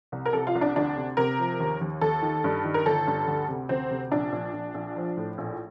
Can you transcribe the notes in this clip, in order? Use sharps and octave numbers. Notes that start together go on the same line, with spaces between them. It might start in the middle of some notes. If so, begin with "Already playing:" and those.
C2
A#4
C3 A4
F4
C2
D4
D2 D4
C3
C3 A#4
F3
D#2
D#2
D#2 A4
D#3
G2
D#3
A#4
G1 A4
G2
D2
C3
D2 C4
C3
A#1 D4
A#1
A#1
A#1
F3
A2
A#1